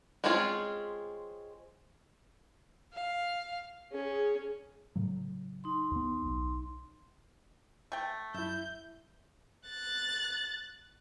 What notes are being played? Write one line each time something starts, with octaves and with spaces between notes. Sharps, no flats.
G#3 C4 C#4 F4 G#4
F5
C#4 G#4
A2 C#3 F#3
D#4 C6
D#2 B3
B1
A3 G5
F#2 E4 E5 G6
F#6 A6